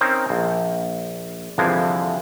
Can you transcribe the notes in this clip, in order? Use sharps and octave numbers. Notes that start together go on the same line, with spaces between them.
C4 C#4 D#4 A#4 C5
A#1
C2 F2 D3 E3 F3 G#3